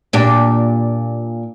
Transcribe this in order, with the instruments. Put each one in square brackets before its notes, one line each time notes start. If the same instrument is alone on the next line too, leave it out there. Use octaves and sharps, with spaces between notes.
[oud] A#2 D4 G4